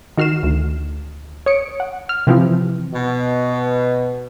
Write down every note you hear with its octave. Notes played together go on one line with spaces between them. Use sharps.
D#3 F#4 F6 C7 E7
D2
C#5 D#6 C#7 D7
F#5
F6
C3 E3 F3 C4
B2